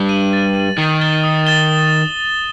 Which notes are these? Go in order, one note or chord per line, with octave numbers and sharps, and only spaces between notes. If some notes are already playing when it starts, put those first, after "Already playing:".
Already playing: G2 G3
D#7 F#7
A6
D#7 F#7
D#3 D#6
A6 E7 G7
D#6
A6 E7 G7